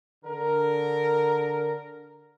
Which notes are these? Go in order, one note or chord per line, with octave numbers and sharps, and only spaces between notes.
D3 A#4